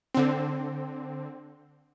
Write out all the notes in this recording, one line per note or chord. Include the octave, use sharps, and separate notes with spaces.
D3 C4